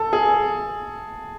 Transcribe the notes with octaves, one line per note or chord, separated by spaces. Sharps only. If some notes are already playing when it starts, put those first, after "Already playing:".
Already playing: A4
G#4